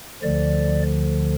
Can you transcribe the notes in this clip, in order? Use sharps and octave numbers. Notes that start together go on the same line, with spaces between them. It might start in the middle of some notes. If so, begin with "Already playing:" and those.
D2 D3 F3 D5